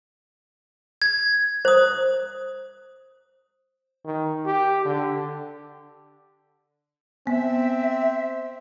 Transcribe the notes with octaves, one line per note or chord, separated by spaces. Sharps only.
G#6
C5 D#6
D#3
G4
D3
B3 C4 E5